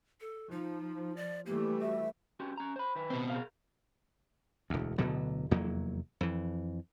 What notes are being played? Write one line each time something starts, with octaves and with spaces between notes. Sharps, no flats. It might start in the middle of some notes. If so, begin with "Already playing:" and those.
A4
F3 D#4
D5
E3 G3 A3 A#3 G4
F#4 E5
C#4 F#4 G4
C#4 A#5
C5 B5
D#3 B4
B2 C4
G#4 A#4 F5
E1 D2
D1 B2 D3 F#3
F1 E2 F#3 A#3
F2 E3